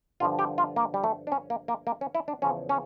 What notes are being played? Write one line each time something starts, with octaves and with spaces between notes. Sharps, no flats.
G2 D3 F3 F4
G4
F4
A#3
G3
A3
D4
C#4
A#3
A#3
A#3
C#4
E4
D4
E2 C#3 F3 C#4
C#4